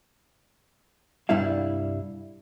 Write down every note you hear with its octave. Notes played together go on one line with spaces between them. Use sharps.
C2 G2 G3 D4 E4 F5